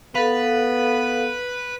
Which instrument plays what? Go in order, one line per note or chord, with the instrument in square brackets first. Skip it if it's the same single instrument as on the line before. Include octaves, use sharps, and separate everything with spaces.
[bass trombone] B3 [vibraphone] A4 F5 [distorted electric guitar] B4